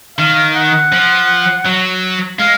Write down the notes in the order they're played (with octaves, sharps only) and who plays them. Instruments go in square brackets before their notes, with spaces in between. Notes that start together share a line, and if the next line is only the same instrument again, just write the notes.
[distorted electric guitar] D#3 [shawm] F5
[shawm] F#5
[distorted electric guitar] F3
F#3
[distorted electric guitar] G#3 [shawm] F5